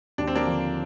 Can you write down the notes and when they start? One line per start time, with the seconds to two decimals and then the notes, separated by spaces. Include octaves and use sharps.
0.18 D#2 D4
0.27 C4
0.35 A#3 D4
0.46 D3 F3